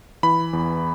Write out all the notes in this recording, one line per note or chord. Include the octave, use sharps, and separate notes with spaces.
E3 B5
E2